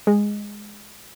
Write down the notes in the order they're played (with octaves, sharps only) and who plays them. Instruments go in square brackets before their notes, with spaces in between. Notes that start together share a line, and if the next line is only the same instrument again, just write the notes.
[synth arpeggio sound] G#3